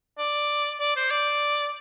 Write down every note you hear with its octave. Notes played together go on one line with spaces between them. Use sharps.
D5
D5
C5
D5